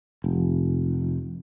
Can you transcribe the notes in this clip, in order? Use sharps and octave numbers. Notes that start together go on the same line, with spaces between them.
F1